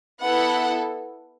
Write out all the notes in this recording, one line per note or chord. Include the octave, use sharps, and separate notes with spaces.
B3 E4 A4 F#5